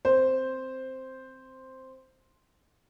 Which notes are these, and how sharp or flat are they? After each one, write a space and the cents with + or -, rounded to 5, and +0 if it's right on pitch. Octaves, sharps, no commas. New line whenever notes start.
C4 +0 C5 +0